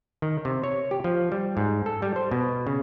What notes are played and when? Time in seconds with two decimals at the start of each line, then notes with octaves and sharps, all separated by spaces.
0.22 D#3
0.45 C3
0.64 C#5
0.91 G4
1.04 F3
1.32 G3
1.57 G#2
1.86 A4
2.02 G3
2.16 C5
2.31 B2
2.67 C#3